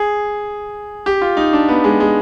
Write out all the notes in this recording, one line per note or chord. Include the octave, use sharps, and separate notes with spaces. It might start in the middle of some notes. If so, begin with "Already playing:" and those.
Already playing: G#4
G4
F4
D#4
D4
B3
G#3
G#3